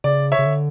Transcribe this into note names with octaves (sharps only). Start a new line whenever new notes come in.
C#3 D5
C#5 E5
C#3
D3